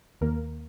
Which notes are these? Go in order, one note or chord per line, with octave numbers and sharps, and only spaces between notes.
D#2 D#3 A#3 A#4